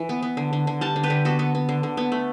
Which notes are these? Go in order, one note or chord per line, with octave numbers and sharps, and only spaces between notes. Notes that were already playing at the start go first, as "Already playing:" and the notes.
Already playing: E3
B3
B3
D3
D3
D3
G3 F#5 A5
D3
G4 B4
D3
B3 F#4 A4
B3
B3
D3
D3
B3
A3